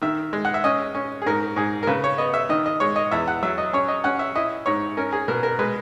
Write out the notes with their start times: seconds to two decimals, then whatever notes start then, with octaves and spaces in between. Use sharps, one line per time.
0.02 D#3 E5
0.33 G#3
0.45 F#5
0.54 E5
0.64 C#4 D#5
0.95 C#4
1.22 G#4
1.26 G#2 A#4
1.56 G#2 G#4
1.83 A#4
1.87 C#3 B4
2.04 C#5
2.18 B3 D#5
2.34 E5
2.49 D#3 D#5
2.66 D#5
2.80 G#3 C#5
2.96 D#5
3.11 E2 E5
3.28 F#5
3.43 F#3 E5
3.58 D#5
3.73 C#4 C#5
3.88 D#5
4.04 C#4 F#5
4.19 E5
4.35 E4 D#5
4.66 G#2 C#5
4.97 C#4 A#4
5.12 G#4
5.28 B2 A#4
5.43 A#4
5.59 G#3 B4